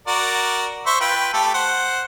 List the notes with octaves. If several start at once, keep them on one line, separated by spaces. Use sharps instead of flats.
F#4 A#4 D5
C5 E5 C#6
F4 B4 G5
A3 G4 A4
C5 F#5